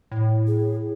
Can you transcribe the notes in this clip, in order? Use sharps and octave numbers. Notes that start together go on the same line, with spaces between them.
A2
G#4